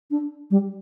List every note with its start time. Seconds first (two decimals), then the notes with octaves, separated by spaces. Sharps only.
0.11 D4
0.51 G3